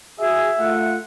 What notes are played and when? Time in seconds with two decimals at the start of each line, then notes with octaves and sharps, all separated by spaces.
0.20 F#4 G#4 E5
0.59 A3 F4 F#5